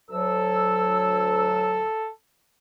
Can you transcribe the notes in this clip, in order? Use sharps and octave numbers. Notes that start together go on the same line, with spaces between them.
D2 F#3 A4 E6